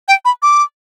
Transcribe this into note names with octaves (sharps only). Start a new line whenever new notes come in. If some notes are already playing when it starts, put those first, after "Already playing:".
G5
B5
D6